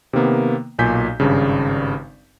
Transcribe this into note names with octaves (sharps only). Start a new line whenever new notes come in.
C3 D#3 A#3 B3
B1 A#2 G#5 G6 B6
G#1 G2 C#3